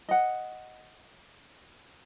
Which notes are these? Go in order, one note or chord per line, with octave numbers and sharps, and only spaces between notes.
D#5 F#5